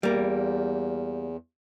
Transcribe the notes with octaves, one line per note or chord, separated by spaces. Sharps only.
E2 G3 A#3